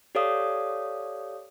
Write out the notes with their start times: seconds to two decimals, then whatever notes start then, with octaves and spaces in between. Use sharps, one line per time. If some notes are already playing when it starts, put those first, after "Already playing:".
0.15 G4 A4 C#5 D5 F5 D#6